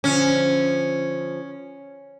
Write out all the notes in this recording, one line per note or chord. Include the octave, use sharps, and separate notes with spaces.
D3 F3 C#4